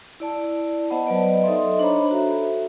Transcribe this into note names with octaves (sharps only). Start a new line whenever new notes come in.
E4 D5 A5
B3 C5 D#5 F#5 A5 B5
F#3 B4 D5 D#5
D#4 A4 D#5 E5 C6
D4 C5 C#5 A#5 B5
F#4 A4 E5